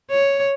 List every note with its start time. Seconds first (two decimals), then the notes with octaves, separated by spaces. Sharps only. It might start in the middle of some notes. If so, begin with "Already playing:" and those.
0.10 C#5